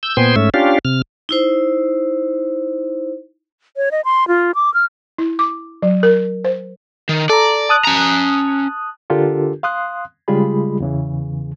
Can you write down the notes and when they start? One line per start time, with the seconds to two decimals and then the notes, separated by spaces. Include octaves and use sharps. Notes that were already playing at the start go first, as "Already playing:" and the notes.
0.03 E6 G6
0.17 A#2 B3 C5 G5 G#5 C6
0.36 G#2 A3 C#4 E5
0.54 C#4 D4 F4 G4 F5
0.85 C3 F6
1.29 D#4 E4 C5
3.77 C#5
3.91 D#5
4.05 C6
4.28 F4
4.55 D6
4.74 F6
5.18 E4
5.39 D6
5.82 F#3
6.03 A#4
6.45 C5
7.09 D#3
7.30 A4 D5 A#5
7.69 A5 D#6 F#6
7.85 C#4 A#5
9.10 D3 D4 F4 G4 A4 A#4
9.63 F5 C6 D#6 F#6
10.28 C#3 G3 G#3 F4 G#4 B5
10.80 E2 C#3 E3